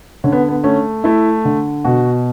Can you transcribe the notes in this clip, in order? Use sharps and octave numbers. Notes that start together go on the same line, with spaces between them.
D3 C#4
B3
B3
A3 C#4
A3 E4
D3
B2 F#4